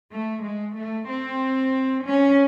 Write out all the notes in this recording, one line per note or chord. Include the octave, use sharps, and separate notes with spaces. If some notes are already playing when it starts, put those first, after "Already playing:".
A3
G#3
A3
C4
C#4